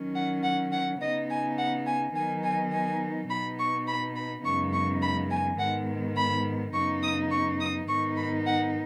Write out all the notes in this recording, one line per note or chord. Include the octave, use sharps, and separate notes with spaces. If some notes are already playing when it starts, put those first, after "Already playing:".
Already playing: D#3 F#3 C#4
F#5
F#5
F#5
C#3 B3 D#4 D#5
G#5
F#5
G#5
D#3 F#3 B3 D#4 G#5
G#5
G#5
B2 B3 D#4 B5
C#6
B5
B5
F#2 C#3 G#3 B3 D#4 C#6
C#6
B5
G#5
G#2 D#3 G#3 B3 F#5
B5
F#2 C#3 B3 D#4 C#6
D#6
C#6
D#6
G#2 D#3 B3 D#4 C#6
B5
F#5